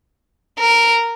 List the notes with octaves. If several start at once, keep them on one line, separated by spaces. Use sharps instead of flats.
A#4